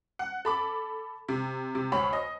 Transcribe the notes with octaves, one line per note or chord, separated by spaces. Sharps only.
F#5
A4 B5 D6
C3
C3
D2 C#5 B5
D#5